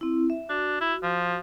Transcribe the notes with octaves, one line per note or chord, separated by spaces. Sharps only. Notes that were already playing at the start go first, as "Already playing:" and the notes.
C4 E4
E5
D4 F#4
E4
F3